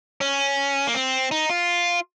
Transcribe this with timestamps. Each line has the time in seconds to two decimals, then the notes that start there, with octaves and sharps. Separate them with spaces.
0.21 C#4
0.87 A#3
0.94 C4
1.31 D#4
1.50 F4